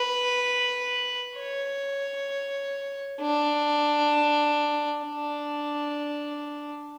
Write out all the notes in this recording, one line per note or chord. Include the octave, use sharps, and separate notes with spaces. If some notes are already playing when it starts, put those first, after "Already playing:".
Already playing: B4
C#5
D4
D4